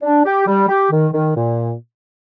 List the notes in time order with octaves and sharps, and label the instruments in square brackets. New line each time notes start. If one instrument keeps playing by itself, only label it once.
[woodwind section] D4
G4
G3
G4
D#3
D#3
A#2